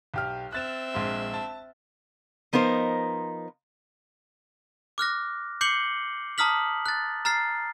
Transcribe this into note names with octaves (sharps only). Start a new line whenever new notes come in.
B1 G4 F6
C4 E5 F#6 A6 E7
A#1 G#3 C6
A5
F3 B3 D#4 A#4 C5
D6 F6 F#6 A#6
D6 G6 C7 C#7 F#7 G7
A5 A#5 D#6 F6 B6 F#7
F#6 A6
A#5 F6 A6 C7